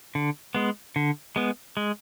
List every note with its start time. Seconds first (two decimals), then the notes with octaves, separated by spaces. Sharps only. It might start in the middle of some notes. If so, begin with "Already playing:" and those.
0.15 D3
0.55 G#3 B3
0.96 D3
1.36 G#3 B3
1.77 G#3